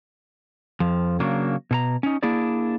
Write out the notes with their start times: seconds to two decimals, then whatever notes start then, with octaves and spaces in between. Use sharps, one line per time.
0.80 F2 F3
1.20 C#3 F#3 A#3 D4
1.71 B2 A4 A#5
2.03 C#4 D#4
2.23 A#3 D4 E4 G#4 D5